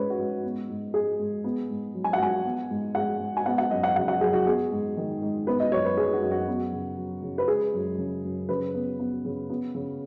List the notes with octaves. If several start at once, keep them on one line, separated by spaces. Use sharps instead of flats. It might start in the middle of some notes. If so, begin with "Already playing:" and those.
Already playing: G#2 G#3 C#4 B4 C#5
F#4
G#2
B3
G#2
G#3 G#4
G#2
B3
G#2
F#3
G#5
F#5
G#2 G#5
B3
G#2
G#3 F#5
G#2
G#5
B3 F#5
F#5
F#2 D#5
F#5
C#3 F#5
F#5
F#2 G#4
F#4
B3 G#4
G#2
D#3
G#2
B3 B4
D#5
F#2 C#5
B4
F#3 G#4
F#4
F#2
F#4
B3
C#3
F#3
C#3
B4
G#3 G#4
F#2
C#3
F#2
C#3 B4
B3
B3
C#3
B3
C#3